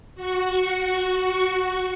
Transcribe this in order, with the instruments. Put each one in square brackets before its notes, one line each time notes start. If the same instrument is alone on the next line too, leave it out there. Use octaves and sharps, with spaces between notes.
[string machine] F#4 C#6